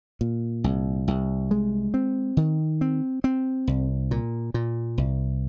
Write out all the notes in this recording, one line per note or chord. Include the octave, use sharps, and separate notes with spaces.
A#2
C2
C2
G#3
C4
D#3
C4
C4
C2
A#2
A#2
C2